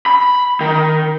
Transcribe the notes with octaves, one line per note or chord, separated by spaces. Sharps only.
B5
D#3